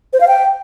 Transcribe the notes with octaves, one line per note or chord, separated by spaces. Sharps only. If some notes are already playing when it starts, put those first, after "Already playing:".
C5
F5
G5